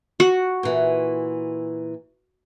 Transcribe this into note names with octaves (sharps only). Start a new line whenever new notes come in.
F#4
A#2 E3